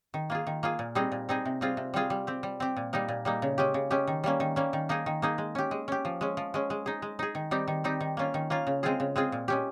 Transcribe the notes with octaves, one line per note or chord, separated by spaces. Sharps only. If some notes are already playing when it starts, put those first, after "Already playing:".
D#3
A#3 F4 G#4
D#3
A#3 F4 G#4
A#2
G3 C4 D#4 G#4
A#2
G3 C4 D#4 G#4
C3
G3 C4 F4 G#4
C3
G3 C4 F4 G#4
G3
C4 G4
G3
C4 G4
A#2
G3 A#3 D#4
A#2
G3 A#3 D#4
C#3
G#3 C#4 G4
C#3
G#3 C#4 G4
D#3
G3 A#3 C#4
D#3
G3 A#3 C#4
D#3
A#3 D#4 G#4
D#3
A#3 D#4 G#4
G#3
C#4 G4
G#3
C#4 G4
F3
G#3 C#4
F3
G#3 C#4
G#3
D#4 G#4
G#3
D#4 G#4
D#3
G3 C4 D#4 G4
D#3
G3 C4 D#4 G4
D#3
A#3 C#4 F4
D#3
A#3 C#4 F4
C#3
G#3 C4 F4 G#4
C#3
G#3 C4 F4 G#4
A#2
G#3 C#4 G4